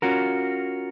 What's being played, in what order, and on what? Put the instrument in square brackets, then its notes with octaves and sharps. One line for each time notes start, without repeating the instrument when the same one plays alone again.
[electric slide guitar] C#4 F4 F#4 A#4